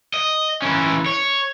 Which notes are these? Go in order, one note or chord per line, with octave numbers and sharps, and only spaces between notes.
D#5
E3 C#4
C#5